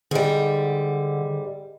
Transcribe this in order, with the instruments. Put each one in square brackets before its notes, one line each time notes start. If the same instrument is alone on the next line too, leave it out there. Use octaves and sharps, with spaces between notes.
[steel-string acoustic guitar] G#2 G3 [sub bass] D3